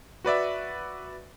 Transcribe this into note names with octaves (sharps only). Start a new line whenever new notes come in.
F#4 B4 D5 E5